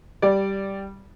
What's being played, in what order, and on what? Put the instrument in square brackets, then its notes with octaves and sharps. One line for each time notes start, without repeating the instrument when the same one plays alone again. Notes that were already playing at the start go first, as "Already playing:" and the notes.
[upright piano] G3 D5